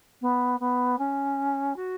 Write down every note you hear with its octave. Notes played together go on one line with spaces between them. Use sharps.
B3
B3
C#4
F#4